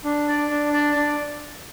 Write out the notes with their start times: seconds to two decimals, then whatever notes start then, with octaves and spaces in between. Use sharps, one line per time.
0.04 D4
0.28 D5
0.51 D4
0.73 D5
0.96 D4